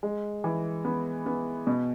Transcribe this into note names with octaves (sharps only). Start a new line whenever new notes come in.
G#3
E3
B3
B3
B2